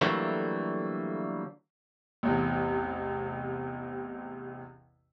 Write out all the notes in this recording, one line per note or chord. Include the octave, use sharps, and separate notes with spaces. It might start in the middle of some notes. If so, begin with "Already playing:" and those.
D3 E3 F#3 G3 A3 A#3
A1 E2 C3